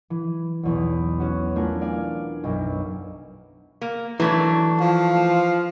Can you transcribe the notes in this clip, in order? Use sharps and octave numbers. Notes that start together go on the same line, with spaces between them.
E3
B1 E2 B2
C#4 F#4
A3 D4 F4 A#4 G#5
D5 F5 G#5
B1 F#2
A#3
E3 F#3 A3 D4
F3 F5